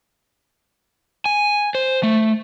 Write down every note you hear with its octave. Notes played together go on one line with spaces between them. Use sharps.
G#5
C5
A3